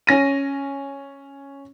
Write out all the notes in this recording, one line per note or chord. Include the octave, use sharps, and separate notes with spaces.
C#4 A#6 D#7